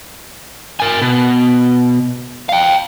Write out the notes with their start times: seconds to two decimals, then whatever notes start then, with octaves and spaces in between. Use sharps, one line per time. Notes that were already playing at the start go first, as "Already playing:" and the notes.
0.80 A#4 G#5
1.02 B2
2.49 F5 G5